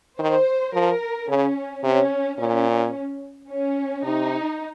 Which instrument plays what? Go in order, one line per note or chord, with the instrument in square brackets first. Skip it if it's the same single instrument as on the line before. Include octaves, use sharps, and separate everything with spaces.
[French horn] D#3 [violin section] C5
[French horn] F3 [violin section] A#4
[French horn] C#3 [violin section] C#4
[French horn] C3 [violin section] C#4
[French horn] A#2 [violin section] C#4
[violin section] C#4
[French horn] C3 [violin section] D#4